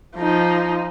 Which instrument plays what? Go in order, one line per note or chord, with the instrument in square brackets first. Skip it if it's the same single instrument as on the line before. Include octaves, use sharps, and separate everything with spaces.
[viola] F3 D#4